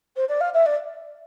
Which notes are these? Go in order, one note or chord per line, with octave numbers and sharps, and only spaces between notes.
C5
D5
F5
E5
D5